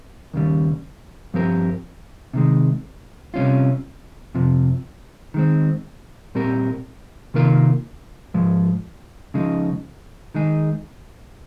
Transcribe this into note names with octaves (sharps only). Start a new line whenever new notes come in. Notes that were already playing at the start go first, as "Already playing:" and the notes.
D#2 C#3 G3
G2 F3 C4 G4 A#4
C3 D#3 G#3
C3 G3 C#4 F4
F2 C3 F3
D#3 G#3 C4
A#2 G3 C4 G4 A#4
C3 D#3 A#3 F4 A#4
G#2 F3 G#3
C#3 F3 G#3 D#4
D#3 G#3 D#4 G#4